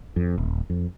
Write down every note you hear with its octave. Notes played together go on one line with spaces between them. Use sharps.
F2
D#1
F2